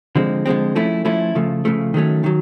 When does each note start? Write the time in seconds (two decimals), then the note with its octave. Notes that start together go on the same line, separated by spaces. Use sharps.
0.16 D3 F3 G#3 C4
0.46 D3 F3 G#3 C4
0.76 F3 A3 C#4 E4
1.05 F3 A3 C#4 E4
1.35 C#3 F3 A3
1.65 C#3 F3 A3
1.94 D#3 F#3 A3 C#4
2.24 D#3 F#3